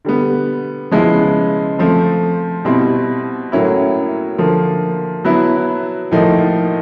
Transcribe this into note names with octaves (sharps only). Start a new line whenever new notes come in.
D3 G3 B3
C#3 F3 G#3 B3 E4
F3 A3 C4
B2 G3 C4 E4
A2 F#3 A#3 C#4 E4
D3 F3 A#3
F#3 B3 E4
A2 F3 A#3 D#4